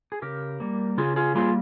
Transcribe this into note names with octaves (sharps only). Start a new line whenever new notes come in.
G#4
C#3 G4 A#4
G3 A#3
C#3 F4 G#4
F4 G#4
G3 A#3 F4 G#4